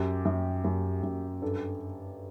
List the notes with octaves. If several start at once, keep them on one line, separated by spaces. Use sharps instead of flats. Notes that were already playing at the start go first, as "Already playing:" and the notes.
Already playing: F#2 G4
F#2
F#2
F#2
G2 A4